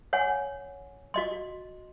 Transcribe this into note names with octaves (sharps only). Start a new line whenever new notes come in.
C#5 F#5 G#5
F#4 D#5 C6